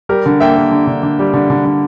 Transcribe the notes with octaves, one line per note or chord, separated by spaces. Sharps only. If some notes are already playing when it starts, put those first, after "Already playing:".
G3 G4 A#4
D3
A#3 E5 G5
A#3
D3
D3
D3
G3
D3
D3
D3